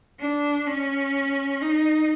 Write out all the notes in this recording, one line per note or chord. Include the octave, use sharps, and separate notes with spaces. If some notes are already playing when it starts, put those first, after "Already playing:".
D4
C#4
D#4